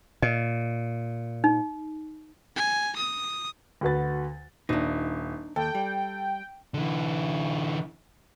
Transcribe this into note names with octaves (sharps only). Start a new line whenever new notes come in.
A#2 D#5
D#4
G#5
D#6
D2 F#4 B4 A6
D#1 D4 D#4
D#2 A4 G5
G3
D3 E3